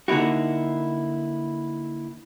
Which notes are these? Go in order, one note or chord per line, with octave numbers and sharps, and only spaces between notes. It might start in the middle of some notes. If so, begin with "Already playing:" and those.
D3 A#3 D#4 E4 F#4